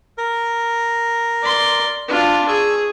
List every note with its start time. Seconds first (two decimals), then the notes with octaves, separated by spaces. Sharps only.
0.18 A#4
1.42 D5 C6
2.08 D4 F4
2.48 G#4 C#6 E6